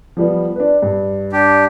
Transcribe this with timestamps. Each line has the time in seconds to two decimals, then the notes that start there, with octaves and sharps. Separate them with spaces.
0.17 F3 G3 B3
0.56 D4 B4
0.82 G2
1.33 D4 G4